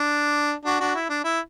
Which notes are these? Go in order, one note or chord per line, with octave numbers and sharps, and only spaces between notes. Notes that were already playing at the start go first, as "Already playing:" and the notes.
Already playing: D4
D4 F#4
D4 F#4
E4
D4
E4